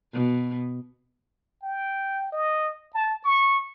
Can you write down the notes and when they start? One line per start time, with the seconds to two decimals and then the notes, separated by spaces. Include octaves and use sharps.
0.13 B2
1.63 G5
2.32 D#5
2.94 A5
3.25 C#6